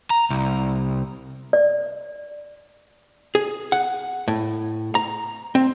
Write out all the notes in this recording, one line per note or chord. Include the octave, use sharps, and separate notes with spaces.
A#5
C2
D5
G#4
F#5
A2
A#5
C4